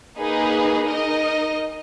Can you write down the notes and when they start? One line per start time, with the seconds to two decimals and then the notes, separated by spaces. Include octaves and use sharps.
0.19 A#3 D#4 G#4 B4
0.87 D#4 A#4 D#5